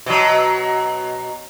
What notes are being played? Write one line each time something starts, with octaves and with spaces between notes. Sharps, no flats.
B2 F#3